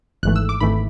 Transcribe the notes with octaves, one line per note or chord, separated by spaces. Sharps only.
G#1 G#2 E3 A3 F#6
E6
D6
G#1 G#2 E3 A3 B5